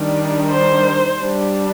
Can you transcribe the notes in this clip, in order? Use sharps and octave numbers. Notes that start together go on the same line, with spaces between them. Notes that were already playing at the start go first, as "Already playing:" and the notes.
Already playing: D#3 G3 D4
C5
G3 D4